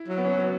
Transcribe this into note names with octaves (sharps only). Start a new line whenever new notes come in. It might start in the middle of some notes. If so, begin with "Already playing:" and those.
Already playing: E4
F#3
B3
C#4
B3